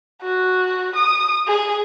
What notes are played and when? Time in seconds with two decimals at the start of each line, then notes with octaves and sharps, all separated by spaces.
0.22 F#4
0.96 D#6
1.47 G#4